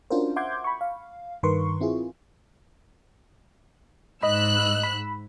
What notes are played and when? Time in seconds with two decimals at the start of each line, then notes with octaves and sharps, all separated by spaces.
0.10 C#4 D4 F4 F#4 A#4 C5
0.36 E5 F#5 C6 D6 G6 G#6
0.64 B5 C#6
0.81 F5
1.43 G2 D#3 A#4 B4 C6 C#6
1.80 C4 E4 F4 G#4
4.23 G#2 D#5 B5 E6 F#6
4.83 B5